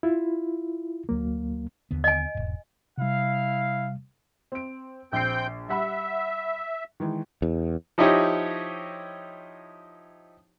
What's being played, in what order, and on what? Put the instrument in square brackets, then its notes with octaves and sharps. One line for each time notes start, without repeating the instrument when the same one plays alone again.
[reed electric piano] E4 F4
D2 F#3 A#3
[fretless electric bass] D#2 D3 B3
[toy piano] D#5 G#5
[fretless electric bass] E1 G#2
[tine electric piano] C3 G3 [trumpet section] E4 F5
[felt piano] C4 D7
[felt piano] A#1 C7 [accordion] C4 G5 G6
[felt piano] G3 F#5 B5 [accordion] E5
[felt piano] D#3 E3 G#3
[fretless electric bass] E2
[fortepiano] F3 D#4 E4 G4 C#5 D#5